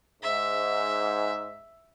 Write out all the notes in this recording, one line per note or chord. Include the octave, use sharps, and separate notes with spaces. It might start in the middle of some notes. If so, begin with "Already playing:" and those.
G#2 E5